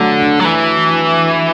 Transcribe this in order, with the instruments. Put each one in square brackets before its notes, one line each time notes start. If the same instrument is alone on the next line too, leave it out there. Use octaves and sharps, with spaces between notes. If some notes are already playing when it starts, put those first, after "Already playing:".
Already playing: [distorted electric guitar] D3 [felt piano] F#3 A3 D4
[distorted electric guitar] F#3
E3